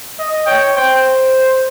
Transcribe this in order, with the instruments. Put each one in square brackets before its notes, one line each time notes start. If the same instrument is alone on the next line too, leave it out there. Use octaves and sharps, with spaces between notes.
[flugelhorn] D#5
[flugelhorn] C#5 [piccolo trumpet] G5
[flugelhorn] C5 [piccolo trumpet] G5